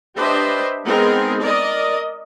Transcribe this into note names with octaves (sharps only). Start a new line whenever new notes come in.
D4 G4 B4 C5 D#5 E5
G#3 B3 C4 D#4 G#4 A#4
A#4 D5 D#5